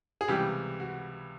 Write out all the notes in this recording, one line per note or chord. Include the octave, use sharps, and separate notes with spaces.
G#4
C#2 C3 E3 G3 G4
F#4